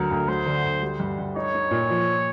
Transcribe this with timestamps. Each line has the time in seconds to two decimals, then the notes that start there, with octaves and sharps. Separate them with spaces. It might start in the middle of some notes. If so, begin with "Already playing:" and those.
Already playing: D2 F#3 A#4
0.11 D2
0.28 F#3 C5
0.46 D3
0.64 D2
0.82 G3
1.00 G2
1.18 G2
1.36 D#4 C#5
1.54 D#4
1.71 A#2
1.90 F3